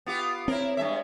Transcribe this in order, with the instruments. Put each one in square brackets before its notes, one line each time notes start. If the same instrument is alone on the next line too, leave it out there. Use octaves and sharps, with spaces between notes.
[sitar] B3 F4 G4
[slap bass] C4 [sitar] E4 A#4 [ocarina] C#5
[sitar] G2 G#3 E5